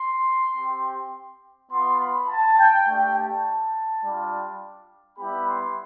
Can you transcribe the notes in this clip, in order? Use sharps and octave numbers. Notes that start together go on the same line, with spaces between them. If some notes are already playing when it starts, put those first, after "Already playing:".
Already playing: C6
C4 G4
B3 F4 C6
B5
A5
G5
A3 D4 G4 G5
A5
G3 D4 F4
G3 B3 E4 G4 B5
C6